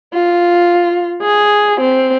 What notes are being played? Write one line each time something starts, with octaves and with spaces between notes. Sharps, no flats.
F4
G#4
C4